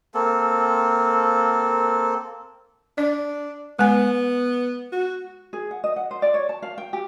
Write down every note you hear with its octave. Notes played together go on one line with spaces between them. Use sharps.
A#3 C4 A4
D4 D5
G#3 B3 G#5
F#4
G#4
F#5
D#5
F#5
C5
D5
C#5
A5
F5
G5
G4